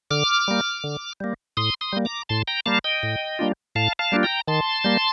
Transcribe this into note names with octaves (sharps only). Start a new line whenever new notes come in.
D3 D6 F6
G3 A#3
D3
G3 A#3
A2 C6 D#6
C6 D#6
G3 A#3
A#5 D6
A2 A5 C6
G5 A#5
G3 A#3 F5 A5
D#5 G5
A2
G3 A#3 D4 F4
A2 F5 A5
F5 A5
G3 A#3 D4 F4
G5 A#5
D#3 A5 C6
G3 A#3